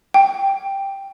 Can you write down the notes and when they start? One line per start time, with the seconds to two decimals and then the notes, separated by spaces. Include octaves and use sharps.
0.14 G5